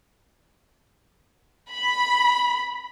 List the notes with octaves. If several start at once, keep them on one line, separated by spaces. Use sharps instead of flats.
B5